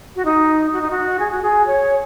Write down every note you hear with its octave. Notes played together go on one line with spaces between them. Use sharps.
F#4
D#4
F#4
D#4
F#4
G#4
F#4
G#4
C#5